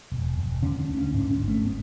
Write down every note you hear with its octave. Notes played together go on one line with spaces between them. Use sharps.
E1
E1
D3 C#4
D4
D2
C#4
G#2 D4
C#4
G#1
A3
B3